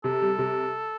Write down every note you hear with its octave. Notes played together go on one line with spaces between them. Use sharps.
C3 A4
G3
C3